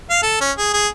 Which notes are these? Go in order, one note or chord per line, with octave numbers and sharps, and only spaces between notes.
F5
A4
C#4
G#4
G#4